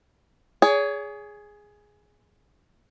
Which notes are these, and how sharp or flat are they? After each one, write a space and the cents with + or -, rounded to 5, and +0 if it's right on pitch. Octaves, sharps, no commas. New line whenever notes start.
G#4 +0 C#5 +35